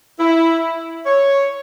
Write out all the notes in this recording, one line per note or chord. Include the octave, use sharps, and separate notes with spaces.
E4
C#5